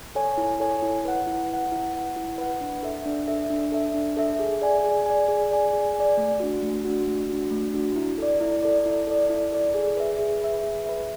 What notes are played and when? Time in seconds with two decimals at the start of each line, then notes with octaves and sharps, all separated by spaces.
0.15 A4 C#5 G#5
0.38 E4
0.60 A4 C#5 G#5
0.82 E4
1.05 B4 F#5
1.27 E4
1.49 B4 F#5
1.72 E4
1.93 B4 F#5
2.16 E4
2.38 B4 F#5
2.61 D4
2.83 A4 E5
3.05 D4
3.28 A4 E5
3.50 D4
3.72 A4 E5
3.94 D4
4.17 A4 E5
4.39 G#4
4.62 D5 G#5
4.84 G#4
5.06 D5 G#5
5.28 G#4
5.51 D5 G#5
5.73 G#4
5.95 D5 G#5
6.17 A3
6.40 D4 F#4
6.62 A3
6.85 D4 F#4
7.07 A3
7.29 D4 F#4
7.51 A3
7.73 D4 F#4
7.96 E4
8.18 A4 D5
8.41 E4
8.63 A4 D5
8.86 E4
9.07 A4 D5
9.30 E4
9.52 A4 D5
9.74 G#4
9.97 B4 E5
10.19 G#4
10.42 B4 E5
10.64 G#4
10.86 B4 E5